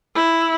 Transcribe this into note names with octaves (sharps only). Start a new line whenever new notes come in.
E4